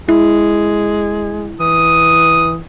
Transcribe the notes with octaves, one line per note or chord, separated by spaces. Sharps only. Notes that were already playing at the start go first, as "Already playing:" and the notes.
G#3 E4
E3 D#6